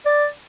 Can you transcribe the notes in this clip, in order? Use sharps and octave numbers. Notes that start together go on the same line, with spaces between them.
D5